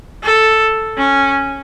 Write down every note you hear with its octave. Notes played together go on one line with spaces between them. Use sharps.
A4
C#4